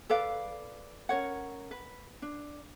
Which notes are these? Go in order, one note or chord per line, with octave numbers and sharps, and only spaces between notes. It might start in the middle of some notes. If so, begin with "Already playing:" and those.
A4 B4 D5 F5
C#4 A#4 C#5 F#5
B4
D4